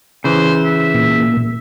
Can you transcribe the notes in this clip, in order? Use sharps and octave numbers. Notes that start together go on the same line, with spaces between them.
C#3 E3 C5
E5
A#2